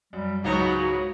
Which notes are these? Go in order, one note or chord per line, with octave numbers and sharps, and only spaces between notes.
F#2 G3
C#2 G#2 C#3 F#3 B3 D#4 F#4